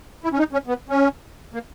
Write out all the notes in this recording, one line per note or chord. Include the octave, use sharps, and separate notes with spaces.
E4
C#4
D#4
C#4
B3
C#4
A#3